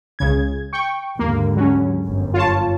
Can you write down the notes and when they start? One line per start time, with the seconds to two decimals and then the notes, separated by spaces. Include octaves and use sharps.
0.19 C#2 C#3 G#6
0.73 G5 C#6
1.19 D#2 G#2 D3 A#3
1.57 F#3 C#4
2.04 G1 F#2
2.34 F4 C#5 A5